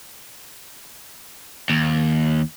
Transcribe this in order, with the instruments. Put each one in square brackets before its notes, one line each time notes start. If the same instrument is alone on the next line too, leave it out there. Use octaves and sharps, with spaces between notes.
[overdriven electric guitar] D#2